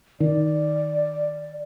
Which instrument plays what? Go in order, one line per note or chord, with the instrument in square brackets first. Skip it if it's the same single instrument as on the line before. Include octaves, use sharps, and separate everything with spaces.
[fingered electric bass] D#3 [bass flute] D5